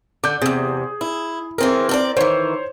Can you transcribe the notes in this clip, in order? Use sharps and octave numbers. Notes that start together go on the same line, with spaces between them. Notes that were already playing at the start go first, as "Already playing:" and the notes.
D3 D6 G6
E2 C3 G#4
E4
E3 C4 G#4 A#4
C4 A4 D5
D#3 E3 C5 C#5